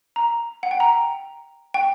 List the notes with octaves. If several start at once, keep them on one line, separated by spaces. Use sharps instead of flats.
A#5
F#5
G5
A#5
G5